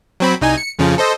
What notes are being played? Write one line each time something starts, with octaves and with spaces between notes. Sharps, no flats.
F#3 C4 B5
C2 D#4 G#5
C#7
F2 C#3 F3
A4 C5 D#5